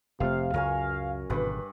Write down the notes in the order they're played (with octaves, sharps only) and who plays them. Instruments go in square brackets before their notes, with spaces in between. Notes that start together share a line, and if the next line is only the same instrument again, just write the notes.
[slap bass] F1 F3 A3 [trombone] C3 [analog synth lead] F5
[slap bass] C#2 [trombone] F#2 [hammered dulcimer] A#4 C#5 G#5
[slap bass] G#1 B2 D3 [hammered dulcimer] G2 B4